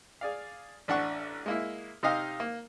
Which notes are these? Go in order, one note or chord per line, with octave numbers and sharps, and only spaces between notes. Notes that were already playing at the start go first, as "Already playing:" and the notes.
G#4 D5 F5
A1 D4 F#5 C#6
G#3 A#3 E4
C3 D#4 G4 D#5 F5 D#6
A#3